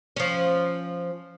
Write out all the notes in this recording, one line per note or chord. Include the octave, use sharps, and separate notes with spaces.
F3 C#4